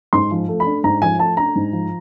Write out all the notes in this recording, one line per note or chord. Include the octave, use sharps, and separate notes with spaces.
G#2 C6
F3
A3
B5
D4
G#2 A#5
F3 G#5
A3 A5
D4 A#5
G#2
F3